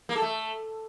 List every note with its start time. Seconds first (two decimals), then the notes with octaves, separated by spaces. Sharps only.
0.09 A#3
0.16 A4
0.22 A3